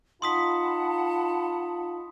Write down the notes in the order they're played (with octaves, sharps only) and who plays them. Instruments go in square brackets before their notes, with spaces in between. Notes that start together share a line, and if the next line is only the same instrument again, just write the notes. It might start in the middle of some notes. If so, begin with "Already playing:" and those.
[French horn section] D#4 F4 [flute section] F#5 A5 B5 [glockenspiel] C6 D#6 B6